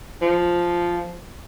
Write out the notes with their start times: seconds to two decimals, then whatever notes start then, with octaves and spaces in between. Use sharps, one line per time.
0.22 F3